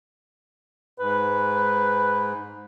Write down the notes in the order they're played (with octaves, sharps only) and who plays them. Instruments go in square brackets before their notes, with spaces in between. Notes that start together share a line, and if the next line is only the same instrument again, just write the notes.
[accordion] G#2 [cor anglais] B4